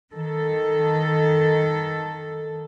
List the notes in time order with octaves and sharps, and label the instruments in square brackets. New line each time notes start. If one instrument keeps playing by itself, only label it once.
[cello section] D#3 A4